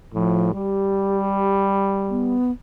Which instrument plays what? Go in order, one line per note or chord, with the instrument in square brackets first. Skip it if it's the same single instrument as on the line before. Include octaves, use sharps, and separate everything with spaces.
[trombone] A2 [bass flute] F3
[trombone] G3 [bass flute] G4
[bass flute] B3